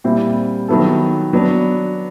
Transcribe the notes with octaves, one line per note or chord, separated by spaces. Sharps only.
A#2 G3 C4 E4
D#3 F#3 B3 E4 A4
F#3 B3 D4